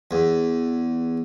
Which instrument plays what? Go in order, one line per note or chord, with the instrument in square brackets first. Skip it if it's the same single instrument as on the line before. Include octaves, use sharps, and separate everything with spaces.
[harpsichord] E2